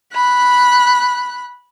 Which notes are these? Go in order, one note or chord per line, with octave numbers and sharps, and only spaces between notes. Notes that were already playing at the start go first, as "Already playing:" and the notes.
B5 F#6